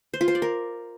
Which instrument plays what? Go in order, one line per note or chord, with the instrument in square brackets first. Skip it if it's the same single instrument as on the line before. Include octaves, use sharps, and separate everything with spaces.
[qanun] C5
F4
C5
D5
A#4